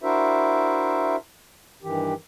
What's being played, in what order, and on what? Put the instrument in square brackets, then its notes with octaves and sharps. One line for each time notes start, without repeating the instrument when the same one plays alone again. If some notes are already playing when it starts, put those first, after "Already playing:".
[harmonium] D4 E4 F#4 A#4 C5 E5
G2 D#3 E3 G4